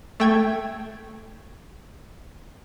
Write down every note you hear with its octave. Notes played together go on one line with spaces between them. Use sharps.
A3 G5 G#6